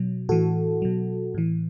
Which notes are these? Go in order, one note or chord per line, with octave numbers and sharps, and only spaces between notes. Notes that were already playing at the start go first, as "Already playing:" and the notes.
Already playing: B2 F#3
A2 E3 F#4 A4
B2 F#3
A2 E3